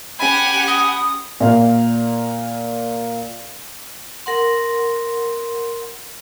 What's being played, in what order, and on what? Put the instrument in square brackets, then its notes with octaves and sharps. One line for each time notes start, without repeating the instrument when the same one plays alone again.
[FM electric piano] C#4 B5 [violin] G4 F#5 [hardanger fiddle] G#5
[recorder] D#6
[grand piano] A#2 F5
[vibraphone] A#4 F#5 C6